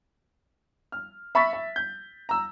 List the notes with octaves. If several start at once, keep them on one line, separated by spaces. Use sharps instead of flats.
F6
E5 B5 C#6 A6 B6
E5
G6
A#5 E6